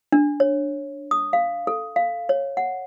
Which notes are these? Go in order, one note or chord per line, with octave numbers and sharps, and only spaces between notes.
D4
C#5
D#6
F5
A4
F5
C#5
F#5